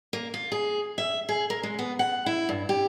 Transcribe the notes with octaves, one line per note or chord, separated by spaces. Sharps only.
A#3
F4
G#4
E5
G#4
A#4
G#3
B3
F#5
E4
G2
G4